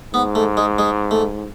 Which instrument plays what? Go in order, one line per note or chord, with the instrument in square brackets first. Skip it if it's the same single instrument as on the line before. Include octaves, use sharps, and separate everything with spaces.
[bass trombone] G#2 [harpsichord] B3
[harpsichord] A3
G#3
G#3
A3